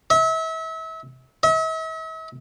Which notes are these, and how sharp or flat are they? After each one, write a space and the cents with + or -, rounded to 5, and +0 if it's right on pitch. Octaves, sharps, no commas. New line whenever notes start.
E5 -35
E5 -45